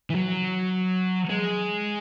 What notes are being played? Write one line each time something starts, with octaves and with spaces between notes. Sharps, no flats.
E3
F#3
G#3